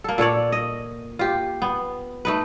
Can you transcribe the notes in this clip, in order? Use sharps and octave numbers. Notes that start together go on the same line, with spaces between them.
A#3 A4
A#2 A4 C#5 D5
D#5
F4 G4
B3
A3 D#4 B4